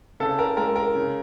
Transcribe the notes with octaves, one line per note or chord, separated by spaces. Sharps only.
C#3 A4
A#4
G#3 A#4
A#4
C#3